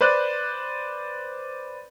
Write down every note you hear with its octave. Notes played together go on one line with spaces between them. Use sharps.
B4 C5 D5 F#6